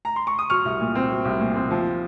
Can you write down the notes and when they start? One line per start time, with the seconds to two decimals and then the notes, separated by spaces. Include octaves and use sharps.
0.05 A#5
0.16 C6
0.27 C#6
0.38 D#6
0.50 F#3 C#6 F6
0.65 C2
0.80 A#2
0.95 C4
1.11 F#3
1.25 C2
1.40 A#2
1.55 C4
1.71 F3